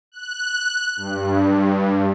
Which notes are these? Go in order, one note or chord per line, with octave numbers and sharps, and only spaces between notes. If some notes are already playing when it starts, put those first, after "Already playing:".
F#6
G2